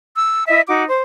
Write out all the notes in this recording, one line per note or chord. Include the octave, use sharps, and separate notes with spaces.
E6
E4 D#5 E5
D#4 F#4 D6
C5